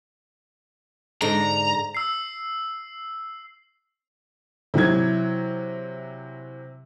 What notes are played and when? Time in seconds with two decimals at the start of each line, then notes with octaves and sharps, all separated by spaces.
1.21 G#2 D3 A#5
1.95 E6 C7
4.74 C3 E3 F#3 G#6